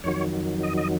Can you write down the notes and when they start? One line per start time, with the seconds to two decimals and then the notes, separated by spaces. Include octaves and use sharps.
0.04 F2 D#3 F#3 C#5
0.63 D#5
0.77 D#5